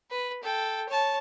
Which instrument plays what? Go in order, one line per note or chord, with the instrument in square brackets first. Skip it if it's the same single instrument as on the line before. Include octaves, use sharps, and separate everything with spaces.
[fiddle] B4
A4 G5
C#5 A5